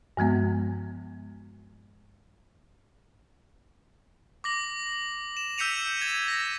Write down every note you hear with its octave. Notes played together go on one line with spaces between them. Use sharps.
G2 F3 G#3 B3
D6 A#6 F#7
E7
E6 G6 B6 C#7 D#7 F7
G#6 E7
A#6